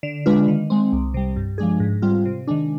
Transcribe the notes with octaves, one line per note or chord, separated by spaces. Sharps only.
D3
G#3 D4 F4 B4
D#3
G#3 C4
C2
C3 G3
G2
F3 G#3 D4 G#4
G#2
G3 C4 F4
C3
D#3 G#3 D4